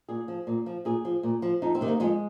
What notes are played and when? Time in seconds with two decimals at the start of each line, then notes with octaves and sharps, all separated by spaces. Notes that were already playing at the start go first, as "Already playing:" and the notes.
0.09 A#2 G#4
0.28 F3
0.47 A#2
0.66 F3
0.85 A#2 G#4
1.05 F3
1.23 A#2
1.42 F3
1.62 F2 D#4
1.75 C4
1.81 C3 D#3
1.88 A#3
2.00 F2 G#3